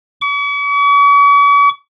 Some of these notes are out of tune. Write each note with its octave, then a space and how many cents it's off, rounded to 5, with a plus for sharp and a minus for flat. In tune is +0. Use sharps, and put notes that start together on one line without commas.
C#6 +45